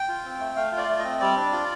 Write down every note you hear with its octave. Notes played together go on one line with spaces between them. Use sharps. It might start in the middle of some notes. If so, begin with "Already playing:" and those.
Already playing: G5
F4
C4
A3
A3 F5
F4
D5
A3
C4 D#5
G3 D5
D4
F4